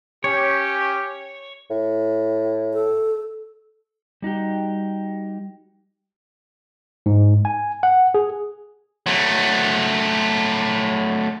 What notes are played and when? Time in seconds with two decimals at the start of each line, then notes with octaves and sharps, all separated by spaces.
0.24 C#4 G4 C#5
1.70 A2
2.73 A4
4.22 G3 D#4 F#4 G4
7.06 G#2
7.45 G#5
7.83 F#5
8.14 G#4
9.06 F#3 A3